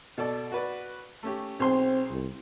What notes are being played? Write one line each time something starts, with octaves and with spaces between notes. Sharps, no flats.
B2 A4 D5
F#4 B4 D5
A3 C#4 G4
B1 C4 G#4 C6
C2